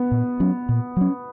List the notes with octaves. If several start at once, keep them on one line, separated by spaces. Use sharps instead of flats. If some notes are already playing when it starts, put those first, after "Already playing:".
Already playing: B3
A#2
F#3 C#4
A#2
F#3 C#4